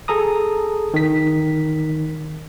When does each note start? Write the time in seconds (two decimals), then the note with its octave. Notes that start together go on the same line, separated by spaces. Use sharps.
0.08 G#4 A4 A#5 D#6
0.94 D#3 B6